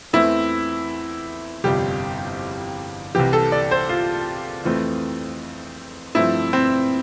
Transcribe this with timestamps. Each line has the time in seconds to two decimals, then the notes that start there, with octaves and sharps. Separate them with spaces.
0.13 E2 E3 A3 C4 E4
1.64 G1 F2 C3 G3 G4
3.15 C2 C3 E3 G4
3.33 A4
3.52 D5
3.71 C5
3.89 F4
4.64 F2 E3 A3 C4
6.15 G2 F3 A3 C4 E4
6.53 C4